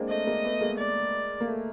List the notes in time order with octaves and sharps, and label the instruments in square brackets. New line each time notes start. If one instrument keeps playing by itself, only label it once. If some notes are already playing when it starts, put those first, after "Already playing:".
Already playing: [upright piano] G#3 A#3 C4 D4
[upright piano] A3 [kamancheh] D#5
[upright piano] G#3 A#3
A3 B3
G#3 A#3
[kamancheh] D5
[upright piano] A#3
A3